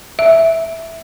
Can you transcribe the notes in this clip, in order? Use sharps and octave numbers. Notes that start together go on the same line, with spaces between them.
E5